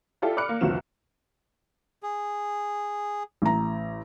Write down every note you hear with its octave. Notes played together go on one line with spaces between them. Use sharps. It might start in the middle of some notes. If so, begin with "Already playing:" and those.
E4 F4 G4 A4 D5
D5 B5 D6 F6 F#6 C#7
A#3
F1 C2 D3 F3 F#3 E7
G#4
A1 A#5